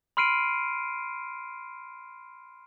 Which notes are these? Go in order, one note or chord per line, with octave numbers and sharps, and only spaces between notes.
B5 C6 F6 C7 D7 D#7